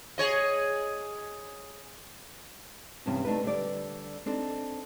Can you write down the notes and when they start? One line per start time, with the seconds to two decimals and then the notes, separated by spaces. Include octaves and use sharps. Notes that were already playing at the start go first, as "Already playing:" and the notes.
0.18 G#4 C#5 D#5
3.06 E2 G2 C3 C4 C#4
3.24 A3 D4 D#4 B4
3.44 D3 G3 D5
4.26 C4 D4 D#4 A4